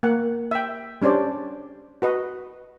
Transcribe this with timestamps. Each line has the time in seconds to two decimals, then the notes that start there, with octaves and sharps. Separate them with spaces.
0.03 A#3 F#5
0.51 E5 G5
1.02 G3 C#4 D4 C5 D5
2.02 F#4 B4 D#5